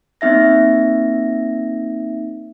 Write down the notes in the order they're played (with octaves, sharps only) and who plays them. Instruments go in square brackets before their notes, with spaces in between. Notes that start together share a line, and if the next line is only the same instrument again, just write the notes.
[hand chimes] A#3 C4 D#4 E5 A#6